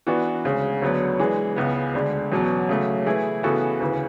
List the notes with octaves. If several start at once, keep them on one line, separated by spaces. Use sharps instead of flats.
E3 B3 D4 F#4
D2 C#3 G#3 C#4
D2 D3 F#3 B3
E3 G#3 D4 G#4
C#2 C#3 E3 B3
D2 D3 G#3 D4
E2 B2 F#3 C#4
C#3 F#3 A3
E3 A3 E4 G#4
C#3 E3 B3 F#4 A4
D2 C#3 E3